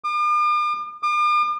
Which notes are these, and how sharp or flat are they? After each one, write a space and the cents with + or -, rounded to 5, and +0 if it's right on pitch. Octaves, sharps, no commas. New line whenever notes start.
D6 +45
D6 +45